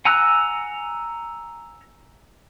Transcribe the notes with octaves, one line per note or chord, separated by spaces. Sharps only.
F#5 G#5 A#5 E6 F#6